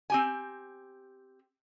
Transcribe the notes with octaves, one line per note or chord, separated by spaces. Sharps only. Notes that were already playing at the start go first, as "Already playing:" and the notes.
C4 G4 G#5